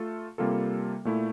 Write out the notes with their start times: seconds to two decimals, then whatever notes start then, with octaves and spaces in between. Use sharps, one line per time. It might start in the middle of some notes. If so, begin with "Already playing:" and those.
Already playing: A3 F4 A4
0.38 C3 G3 A#3 F4 A4
1.05 A#2 A3 E4